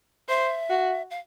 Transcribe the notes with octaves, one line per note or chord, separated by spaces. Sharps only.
C5 E5
F#4
F5